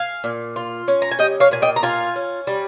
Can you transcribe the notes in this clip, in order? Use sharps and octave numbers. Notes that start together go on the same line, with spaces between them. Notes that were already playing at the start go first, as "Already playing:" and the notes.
Already playing: F5 G#5
A#2
F4
C#4
A#5
G#5
G3 D#5 G5
C#5 F5
A#2 G#5
D#5 G5
A#5
F4 F5 G#5
C#4
G3